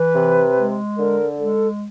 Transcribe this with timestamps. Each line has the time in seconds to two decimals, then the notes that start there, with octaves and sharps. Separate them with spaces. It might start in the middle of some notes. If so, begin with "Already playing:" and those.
Already playing: E3 B4
0.14 C3
0.56 G#3
0.98 D3 A#4
1.39 G#3 A4